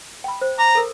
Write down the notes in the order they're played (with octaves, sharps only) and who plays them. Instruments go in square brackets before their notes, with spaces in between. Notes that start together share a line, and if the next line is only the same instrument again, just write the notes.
[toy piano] G5 B5
C5
[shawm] A#5 [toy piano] D6
[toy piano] A4 A#4